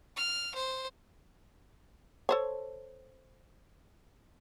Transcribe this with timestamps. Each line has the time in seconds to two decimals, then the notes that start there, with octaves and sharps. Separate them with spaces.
0.16 F6
0.54 C5
2.29 A4 C5 C#5